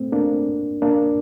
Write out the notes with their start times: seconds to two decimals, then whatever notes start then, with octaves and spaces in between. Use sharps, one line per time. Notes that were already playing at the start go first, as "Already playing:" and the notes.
Already playing: A3 C4
0.12 A#3 D4
0.82 A#3 D4